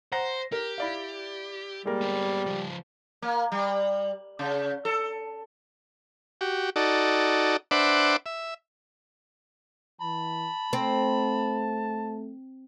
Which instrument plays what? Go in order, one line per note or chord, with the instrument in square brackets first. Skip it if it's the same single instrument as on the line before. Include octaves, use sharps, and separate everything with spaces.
[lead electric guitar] C5 [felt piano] F#5 A#5 A#6
[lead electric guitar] G4 [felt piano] A#4
[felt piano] E4 D5 F5
[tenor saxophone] G3 [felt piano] G#3 A#3 A#4
[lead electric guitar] B3 G4
C#3 F3
[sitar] A#3
G3
C#3
A4
[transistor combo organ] F#4 G4
D#4 F#4 A4 D5
D4 B4 C5 E5 F#5 D6
E5
[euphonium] E3 [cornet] A5 [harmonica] B5
[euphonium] A3 [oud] C4